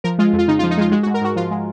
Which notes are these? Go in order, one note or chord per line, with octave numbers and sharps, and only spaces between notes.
F3 A#4
G#3 F4
F2
F4
C#3 D#4
F4
F3
D#4
G#3 F4
G#3 F#4
F#4
G#2
A#4
G#2 F#4
F3 F4
G#3